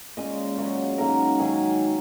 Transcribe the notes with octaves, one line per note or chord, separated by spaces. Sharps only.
A#2 G#3 C#4 D#5
C#3 F#3 C#4
G#2 F#3 A#3 C#4 A#4
G#2 D#3 F#3 C#4 G#4